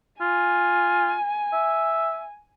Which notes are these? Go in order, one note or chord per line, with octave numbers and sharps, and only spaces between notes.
F4 G#5
E5